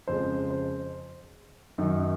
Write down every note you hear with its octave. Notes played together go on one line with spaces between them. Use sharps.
F2 C#3 G#3 C5
C5
F#2 D#3 F#3 D#4